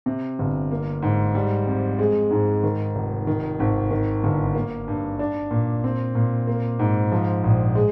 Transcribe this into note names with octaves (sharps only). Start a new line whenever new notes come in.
C3
G1
A#3
G#2
G3
F2
G#3
G#2
D#3
F1
D#3
G#1
D#3
G1
A#3
G2
D4
A#2
C4
A#2
A#3
G#2
F3
A#1
G#3